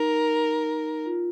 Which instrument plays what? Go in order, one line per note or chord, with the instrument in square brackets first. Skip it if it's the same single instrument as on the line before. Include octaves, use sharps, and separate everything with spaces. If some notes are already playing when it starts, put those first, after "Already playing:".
Already playing: [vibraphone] D#4 [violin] A#4
[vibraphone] F4